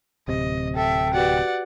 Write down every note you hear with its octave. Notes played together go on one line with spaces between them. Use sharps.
D1 C3 D#5
A4 E5 G5
F#4 G4 B4 D5 F#5